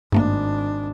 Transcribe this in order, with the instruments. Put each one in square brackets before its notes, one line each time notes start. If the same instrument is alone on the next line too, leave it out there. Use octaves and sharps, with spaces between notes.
[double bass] G#1 D4 [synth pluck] G2 A3 A#3